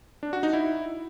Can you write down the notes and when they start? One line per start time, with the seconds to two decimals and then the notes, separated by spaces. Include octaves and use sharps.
0.23 D4
0.33 F#4
0.43 D#4
0.53 E4